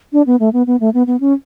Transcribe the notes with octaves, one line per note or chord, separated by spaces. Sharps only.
D4
B3
A3
B3
B3
A3
B3
B3
C#4